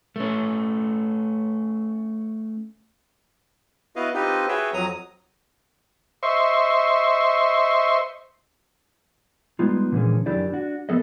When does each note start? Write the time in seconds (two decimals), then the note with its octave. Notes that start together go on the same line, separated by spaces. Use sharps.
0.16 A3 C#4
3.96 B3 E4 F#4 B4 D#5 F5
4.14 C4 D#4 F4 G4 B4 D#5
4.48 F#4 G#4 B4 C#5 E5 G5
4.74 F2 F#3 A#5 D#6
6.23 C5 D#5 E5 C6 C#6
9.59 G3 G#3 B3 D#4 F4
9.92 A#2 D3 E3 F3 G#3 C#4
10.26 F#2 D#3 D4 E4 G4 D5
10.50 D4 F#4
10.89 F3 B3 A4 A#4 D#5